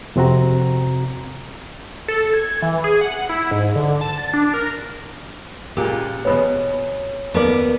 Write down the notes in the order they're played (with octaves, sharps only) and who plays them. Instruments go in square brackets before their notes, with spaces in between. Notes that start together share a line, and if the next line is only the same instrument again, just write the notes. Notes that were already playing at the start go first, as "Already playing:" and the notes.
[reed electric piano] F2 C3 C4 F#4 A#5
[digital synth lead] A4
G#6
E3
G#4
F#5
E4
G#2
D3
A5
A6
D4
A#4
[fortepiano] C#2 A#2 [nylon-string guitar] G4
[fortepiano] E2 B2 B3 [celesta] C#5
[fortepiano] D#2 [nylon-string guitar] B3 A#4 D5